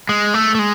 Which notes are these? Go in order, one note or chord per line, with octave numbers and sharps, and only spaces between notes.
G#3
A3
A3
G#3